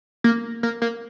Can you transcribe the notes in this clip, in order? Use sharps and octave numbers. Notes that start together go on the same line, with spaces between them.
A#3
A#3
A#3